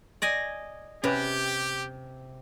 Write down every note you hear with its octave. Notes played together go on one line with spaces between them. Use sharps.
D5 D#5 G#5
C3 C#4 G4 B4